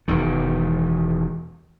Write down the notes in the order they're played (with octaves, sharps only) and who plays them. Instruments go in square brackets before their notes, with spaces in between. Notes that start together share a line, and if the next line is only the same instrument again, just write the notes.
[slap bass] E1 E2 D#3